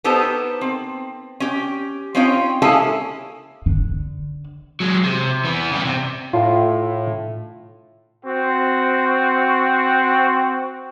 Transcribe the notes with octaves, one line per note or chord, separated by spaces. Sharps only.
B3 D#4 G4 A4 A#4 C5
C4
C#4 G4
C4 C#4 D#4 F4 C#5 G5
G#3 A#3 C#4 E4 G#4 A4
D3
F#3 G#3
C3
E3 B3
C#3 G3
C3
A2 F4
C4 F#4